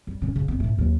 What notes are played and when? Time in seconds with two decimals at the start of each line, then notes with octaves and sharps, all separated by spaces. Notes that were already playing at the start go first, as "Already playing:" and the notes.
0.07 G3
0.22 D3 C#4
0.36 C#3
0.48 F2 B3
0.60 G#2 A3
0.78 D#2 F#3